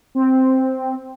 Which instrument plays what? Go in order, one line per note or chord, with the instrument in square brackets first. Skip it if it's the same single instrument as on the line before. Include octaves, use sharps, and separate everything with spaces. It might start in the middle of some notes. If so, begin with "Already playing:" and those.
[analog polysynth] C4